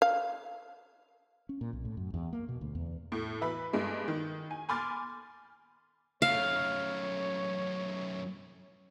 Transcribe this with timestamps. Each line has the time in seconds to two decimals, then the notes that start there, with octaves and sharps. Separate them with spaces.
0.02 F5
1.49 C#4
1.61 A#2
1.73 B1
1.85 A2
1.97 F#2
2.14 E2
2.33 A#3
2.49 B2
2.61 D2
2.75 E2
3.12 A2
3.41 E3 E4 B4 B5
3.73 G2 G#3 A3
4.08 D#3
4.51 G#5
4.69 G#5 B5 C6 D6 F6 A6
6.22 F#2 A3 C#5 F5